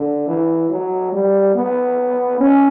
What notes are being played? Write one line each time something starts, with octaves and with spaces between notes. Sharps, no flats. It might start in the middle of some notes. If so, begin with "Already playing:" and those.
Already playing: D3
E3
F#3
G3
B3
C#4